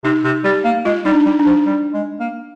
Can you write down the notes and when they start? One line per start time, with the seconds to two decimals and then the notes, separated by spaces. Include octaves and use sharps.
0.04 C3 D#4
0.24 C3
0.44 G3 G4
0.65 A#3
0.85 G#3 F4
1.05 G3 D#4
1.12 D4
1.25 G3
1.39 D4
1.46 F3
1.66 G3
1.93 G#3
2.20 A#3